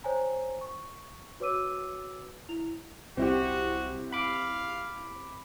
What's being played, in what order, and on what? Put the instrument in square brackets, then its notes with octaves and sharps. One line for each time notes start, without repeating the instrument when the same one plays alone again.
[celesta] C5 C#5 G5 G#5 A#5
C#6
F#4 B4 C#5 D6 E6 D#7
E4 F7
[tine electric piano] C2 [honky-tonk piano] C4 E4 G4 [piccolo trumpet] F#4
[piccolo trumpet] F5 [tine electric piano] B5 D6